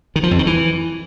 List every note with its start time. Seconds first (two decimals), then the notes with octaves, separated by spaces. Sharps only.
0.16 D#3
0.23 F3
0.31 F2
0.39 D#3
0.47 E3